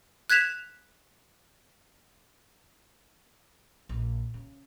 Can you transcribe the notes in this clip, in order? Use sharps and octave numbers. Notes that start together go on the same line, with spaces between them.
F#6 G#6 B6 E7 F7
A#1
C#3